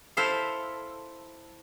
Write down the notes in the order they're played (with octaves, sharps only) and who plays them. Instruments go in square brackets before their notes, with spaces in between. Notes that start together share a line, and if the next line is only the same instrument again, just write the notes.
[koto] E4 A4 C5 F5